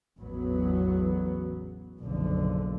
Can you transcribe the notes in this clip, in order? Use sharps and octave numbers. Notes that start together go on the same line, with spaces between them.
A1 E2 F#3 B3
F#1 B1 D3 F3